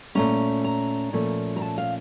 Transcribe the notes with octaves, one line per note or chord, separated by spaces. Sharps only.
A#2 A3 C#4 A#5
A#5
A#2 F3 A3 C#4
A#5
A5
F5